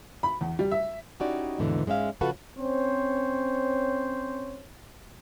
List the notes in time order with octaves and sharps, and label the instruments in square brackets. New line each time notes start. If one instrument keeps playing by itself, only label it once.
[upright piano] B5
E2
G3
E5
[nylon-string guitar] C#4 D#4 E4 F#4 G4 D5
D#2 G#2 B2 D3 E3
G#2 G#3 C#4 E5 F5
C#3 F3 F4 F#4 A4 B4
[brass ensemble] C4 C#4 C5 C#5